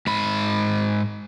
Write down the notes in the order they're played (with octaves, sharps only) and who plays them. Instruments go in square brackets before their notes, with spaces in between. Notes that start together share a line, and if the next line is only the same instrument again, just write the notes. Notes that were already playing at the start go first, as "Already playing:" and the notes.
[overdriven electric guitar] G#2 B5